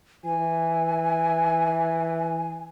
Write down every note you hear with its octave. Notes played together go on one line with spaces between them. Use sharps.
E3 G#5